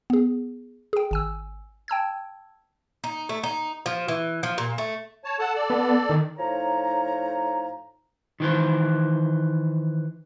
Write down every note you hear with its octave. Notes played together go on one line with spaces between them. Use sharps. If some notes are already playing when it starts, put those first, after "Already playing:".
B3 G#4
G#4 G5
G#1 G#5 E6
G5 A5 E6 G#6
D#4
A3
D#4
F3
E3
F3
A#2
A3
C#5 A5
A4 F#5 A5
A4 D5
B3
D#3
A2 F3 D#4 C#5 A#5
D#3 E3 C5